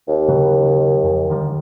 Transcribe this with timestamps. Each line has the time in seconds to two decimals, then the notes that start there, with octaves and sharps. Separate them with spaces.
0.08 D#2
0.28 C#3 F#3
1.03 F2
1.30 D3 D#3 G3